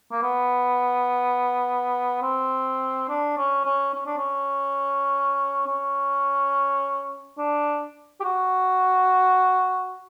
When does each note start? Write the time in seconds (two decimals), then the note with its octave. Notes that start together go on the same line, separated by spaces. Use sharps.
0.12 A#3
0.22 B3
2.22 C4
3.09 D4
3.37 C#4
3.65 C#4
3.94 C#4
4.06 D4
4.17 C#4
5.67 C#4
7.38 D4
8.20 G4
8.24 F#4